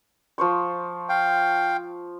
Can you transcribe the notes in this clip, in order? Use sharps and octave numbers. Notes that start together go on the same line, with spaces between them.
F3 C5 C#6
F5 G5